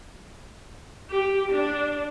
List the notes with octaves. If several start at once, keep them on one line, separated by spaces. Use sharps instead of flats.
G4
D4